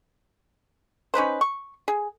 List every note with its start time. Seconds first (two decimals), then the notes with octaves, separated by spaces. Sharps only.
1.14 C#4 D#4 B4 C5
1.41 C#6
1.88 G#4